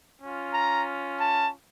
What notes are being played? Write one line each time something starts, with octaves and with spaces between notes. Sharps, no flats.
C#4 F4
A#5
A5